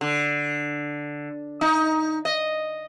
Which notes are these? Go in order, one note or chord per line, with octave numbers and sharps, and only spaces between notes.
D3
D#4
D#5